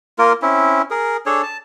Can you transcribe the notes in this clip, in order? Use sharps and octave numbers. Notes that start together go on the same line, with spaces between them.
A#3 F4 A#4
C4 C#4 E4
G#4 A#4
D4 G#4 A4 C#5
A5